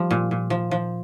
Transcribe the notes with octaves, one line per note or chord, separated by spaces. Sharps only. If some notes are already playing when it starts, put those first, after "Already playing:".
Already playing: F3 G3
A#2
A#2
F3
F3